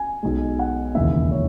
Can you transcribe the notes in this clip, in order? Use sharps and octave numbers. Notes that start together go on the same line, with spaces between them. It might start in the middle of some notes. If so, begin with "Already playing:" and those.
Already playing: G#5
B1 B2 G#3
F#5
E1 D#2 C#3 E3 E5
C#5